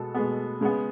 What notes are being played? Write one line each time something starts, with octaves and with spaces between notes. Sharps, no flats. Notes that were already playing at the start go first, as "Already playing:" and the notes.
Already playing: B2 G#3 B3 A4
B2 G#3 B3
C#3 G#3 B3